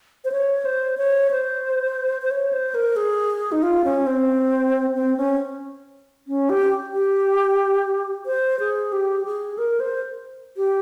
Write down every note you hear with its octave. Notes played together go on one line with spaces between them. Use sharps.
C5
C#5
C5
C#5
C5
C5
C#5
C5
A#4
G#4
D#4
F4
C#4
C4
C4
C#4
C#4
G4
G4
C5
G#4
G4
G#4
A#4
C5
G4